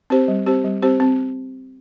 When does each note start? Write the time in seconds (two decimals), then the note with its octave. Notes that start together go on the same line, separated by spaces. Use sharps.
0.10 C4 G4 C5
0.28 G3
0.46 C4 G4 C5
0.64 G3
0.82 C4 G4 C5
1.00 C4